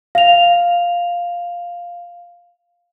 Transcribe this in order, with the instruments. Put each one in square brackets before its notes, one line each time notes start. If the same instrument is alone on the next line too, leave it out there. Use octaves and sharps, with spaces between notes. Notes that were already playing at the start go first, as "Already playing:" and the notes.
[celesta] F5 F7